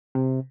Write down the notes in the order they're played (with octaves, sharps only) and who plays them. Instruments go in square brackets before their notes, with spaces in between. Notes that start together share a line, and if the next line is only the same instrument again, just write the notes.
[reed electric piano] C3